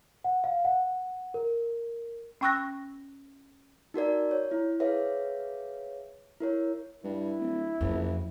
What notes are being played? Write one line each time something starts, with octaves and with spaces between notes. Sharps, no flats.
F#5
F5
F#5
A#4
C#4 G5 C#6 E6 F#6 A#6
D#4 F#4 A#4 D5
C#5
E4
G#4 B4 C#5 E5 F5
E4 A#4 C#5
G2 E4
D1
F#1 F2